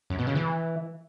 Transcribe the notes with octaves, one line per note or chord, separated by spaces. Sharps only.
F#2
B2
C#3
E3